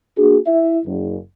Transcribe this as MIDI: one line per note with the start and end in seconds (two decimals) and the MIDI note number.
0.17 0.38 58
0.17 0.38 62
0.17 0.38 66
0.17 0.38 68
0.47 0.78 64
0.47 0.78 76
0.86 1.16 30